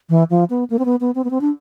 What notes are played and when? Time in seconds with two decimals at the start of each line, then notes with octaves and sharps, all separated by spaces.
0.09 E3
0.30 F3
0.50 B3
0.70 A#3
0.79 C4
0.85 B3
1.00 B3
1.15 C4
1.24 B3
1.30 C4
1.41 D4